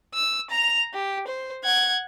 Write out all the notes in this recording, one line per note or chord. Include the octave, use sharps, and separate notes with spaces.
E6
A#5 F7
G4
C5
F#5 G#6